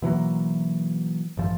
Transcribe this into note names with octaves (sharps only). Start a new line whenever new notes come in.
B2 E3 F#3 A#3
A1 G2 F3